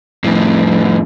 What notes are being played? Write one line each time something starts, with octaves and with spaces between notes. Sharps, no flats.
F2 A2